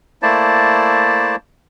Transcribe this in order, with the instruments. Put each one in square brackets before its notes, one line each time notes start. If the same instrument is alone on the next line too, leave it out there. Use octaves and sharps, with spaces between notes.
[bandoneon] A3 A#3 E4 C5 D5 A5